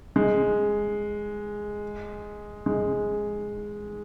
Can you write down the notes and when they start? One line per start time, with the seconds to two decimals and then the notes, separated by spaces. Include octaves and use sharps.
0.16 G#3
2.66 G#3